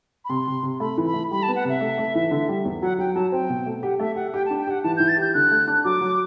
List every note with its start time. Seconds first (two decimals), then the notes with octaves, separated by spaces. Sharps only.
0.25 B5
0.29 C3 C6
0.47 C3
0.63 C3
0.80 A3 B5
0.98 E3
1.06 B5
1.14 A3
1.31 G3 B5
1.43 A5
1.48 B3
1.56 F#5
1.65 C3 E5
1.81 A3
1.98 A3
2.15 E3
2.31 D3
2.49 G3
2.65 E2
2.82 F#3 F#5
2.99 F#3 G5
3.15 F#3 A5
3.32 C4 G5
3.50 B2
3.66 A3
3.83 G4 F#5
4.00 A3 E5
4.16 G4 F#5
4.34 G4 G5
4.46 A5
4.51 D4
4.59 G5
4.67 G4 F#5
4.83 E3 A5
4.97 E3 G6
5.08 A6
5.17 G4 G6
5.34 D3 F#6
5.51 A3
5.67 D4
5.84 F#3 D6
6.01 F#3